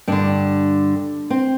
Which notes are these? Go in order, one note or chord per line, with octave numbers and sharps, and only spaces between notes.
G2 D3 D4
C4